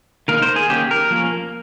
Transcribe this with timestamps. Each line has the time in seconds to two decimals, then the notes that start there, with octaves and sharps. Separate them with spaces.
0.28 D#3 A#3 D#4 A#4
0.42 C5
0.56 G#4
0.70 D#3 A#3 C#4 G4
0.91 A#4
1.10 F3 A#3 C#4